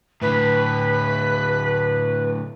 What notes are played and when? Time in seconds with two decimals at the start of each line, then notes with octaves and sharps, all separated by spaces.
0.21 A2 D3 B4